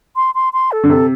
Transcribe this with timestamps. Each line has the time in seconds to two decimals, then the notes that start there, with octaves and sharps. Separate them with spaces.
0.16 C6
0.35 C6
0.53 C6
0.72 A4
0.84 D3
0.90 C3 A4